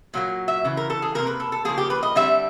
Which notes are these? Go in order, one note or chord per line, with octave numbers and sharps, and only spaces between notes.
A#2 F#3 A#3
E5
C#3 E3
A#4
A4
G#4
C3 F3 A#3 A#4
B4
A4
A4
C#3 F3 A#3 G#4
G4
B4
D#5
D3 G3 C4 E5